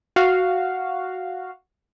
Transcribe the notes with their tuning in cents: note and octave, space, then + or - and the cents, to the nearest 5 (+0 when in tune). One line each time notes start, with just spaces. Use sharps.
F#4 +0 F5 +0